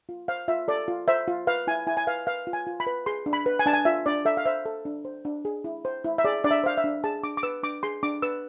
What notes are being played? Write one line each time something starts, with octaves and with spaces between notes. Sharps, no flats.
F4
C5 F5
F4 E5
A4 D5
F4
C5 E5
F4
B4 F5
E4 G#5
E4 G#5
G#5
B4 F5
B4 F5
F4
G#5
F4
B5
B4
G#4 C6
D4
B5
B4
G#5
D4 A5
G#5
F4 E5
D4 D5
A4 E5
F5
C5 E5
A4
D4
C5
D4
G#4
E4
C5
E4
E5
G#4 D5
D4 D5
E5
C5 F5
E5
D4
G#4 A5
D4 D6
D6
B4 E6
D4 D6
G#4 C6
D4 D6
B4 E6